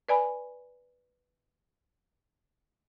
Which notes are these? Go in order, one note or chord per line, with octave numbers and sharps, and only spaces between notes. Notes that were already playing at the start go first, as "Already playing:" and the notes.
B4 D5 G#5 B5